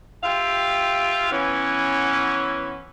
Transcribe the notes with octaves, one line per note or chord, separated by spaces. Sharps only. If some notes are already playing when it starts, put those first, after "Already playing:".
F4 G4 E5 F5 G5
E3 B3 C#4